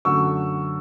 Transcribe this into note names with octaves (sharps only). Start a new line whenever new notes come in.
F#2 D3 F#3 A3 C#6 E6